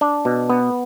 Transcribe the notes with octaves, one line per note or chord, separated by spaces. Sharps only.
D4
B2
B3